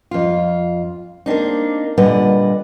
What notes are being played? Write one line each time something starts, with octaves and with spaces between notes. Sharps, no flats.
F2 F4
A#3 C4 D4 D#4
A#2 D3 G3 B4 D#5 F#5